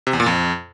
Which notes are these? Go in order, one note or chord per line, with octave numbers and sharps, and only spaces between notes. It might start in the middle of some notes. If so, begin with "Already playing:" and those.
C3
E2
A#2
F2